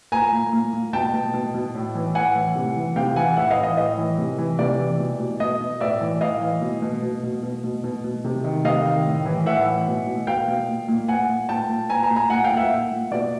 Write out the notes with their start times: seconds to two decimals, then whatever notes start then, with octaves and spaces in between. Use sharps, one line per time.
0.12 A#2 G#5 A#5
0.32 A#2
0.52 A#2
0.73 A#2
0.93 B2 G5 A5
1.14 B2
1.34 B2
1.54 B2
1.75 A2
1.95 E3
2.15 A2 F#5 G#5
2.35 E3
2.56 C3
2.76 E3
2.96 C3 F5 G5
3.16 E3 F#5 G#5
3.37 A2 E5 F#5
3.51 D#5 F5
3.57 E3
3.63 D#5
3.77 A2 D#5
3.98 E3
4.18 C3
4.38 E3
4.59 C3 D5
4.79 E3
4.99 B2
5.20 B2
5.40 B2 D#5
5.60 B2
5.81 A2 D5 E5
6.01 E3
6.21 A2 D#5 F5
6.41 E3
6.61 B2
6.82 B2
7.02 B2
7.23 B2
7.43 B2
7.64 B2
7.84 B2
8.04 B2
8.24 C3
8.44 D#3
8.64 C3 D#5 F5
8.85 D#3
9.05 A2
9.26 E3
9.46 A2 E5 F#5
9.66 E3
9.87 B2
10.07 B2
10.27 B2 F5 G5
10.48 B2
10.68 A#2
10.88 A#2
11.08 A#2 F#5 G#5
11.29 A#2
11.49 A#2 G5 A5
11.69 A#2
11.89 A#2 G#5 A#5
12.03 G#5 A#5
12.10 A#2
12.16 G#5 A#5
12.30 A#2 F#5 G#5
12.44 F5 G5
12.51 A#2
12.57 E5 F#5
12.71 A#2
12.92 A#2
13.11 B2 D5